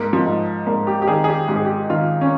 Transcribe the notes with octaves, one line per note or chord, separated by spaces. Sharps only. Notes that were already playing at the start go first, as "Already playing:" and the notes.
Already playing: G#2 A#3
F3
G#2
G#2 A#3
G4
G4
D#3 G#4
G#4
G4
G#2 G4
G#4
G4
D#3 F4
C#4